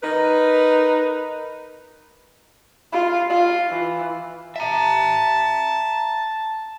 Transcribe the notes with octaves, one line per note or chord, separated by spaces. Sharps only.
D#4 A#4 B4
F4
F4
E3
E5 A5 A#5